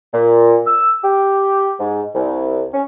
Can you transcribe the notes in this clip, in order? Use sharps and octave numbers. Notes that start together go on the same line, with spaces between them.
A#2
E6
G4
G#2
C2
C#4